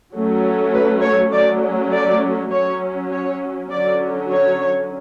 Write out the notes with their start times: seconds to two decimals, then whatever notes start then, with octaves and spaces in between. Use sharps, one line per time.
0.14 F#3 A3 C#4
0.73 B4
1.03 C#5
1.32 F#3 A3 C#4 D5
1.92 D5
2.52 F#3 C#4 C#5
3.11 C#5
3.71 D3 F#3 C#4 D5
4.30 C#5